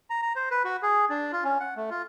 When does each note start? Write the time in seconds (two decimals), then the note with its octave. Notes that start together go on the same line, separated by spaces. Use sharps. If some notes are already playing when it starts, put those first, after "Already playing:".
0.10 A#5
0.22 A#5
0.36 C5
0.51 B4
0.65 F#4
0.83 G#4
1.10 D4
1.32 F4
1.44 C#4
1.60 F#5
1.76 A3
1.90 F4